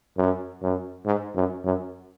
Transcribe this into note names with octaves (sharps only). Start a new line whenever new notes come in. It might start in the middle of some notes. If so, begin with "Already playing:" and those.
F#2
F#2
G#2
F#2
F#2